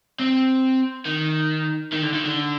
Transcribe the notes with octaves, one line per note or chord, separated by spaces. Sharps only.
C4
D#3
D#3
D3
D#3
D3